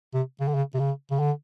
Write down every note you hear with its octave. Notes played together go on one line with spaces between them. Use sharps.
C3
C#3
D3
C#3
C3
C#3
C#3
D3